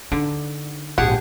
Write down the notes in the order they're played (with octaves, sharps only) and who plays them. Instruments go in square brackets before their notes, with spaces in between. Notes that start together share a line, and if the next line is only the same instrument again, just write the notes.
[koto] D3 [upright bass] D#4
[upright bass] A#1 G#2 [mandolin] G4 G#4 A5 [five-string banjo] F#5